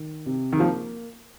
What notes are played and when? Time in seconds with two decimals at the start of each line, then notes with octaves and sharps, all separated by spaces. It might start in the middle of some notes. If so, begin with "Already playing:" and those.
Already playing: D#3
0.26 C3
0.53 D#3
0.59 F3 A#3